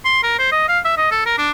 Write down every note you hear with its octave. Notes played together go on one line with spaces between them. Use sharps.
C6
A#4
C5
D#5
F5
E5
D#5
A4
A#4
D4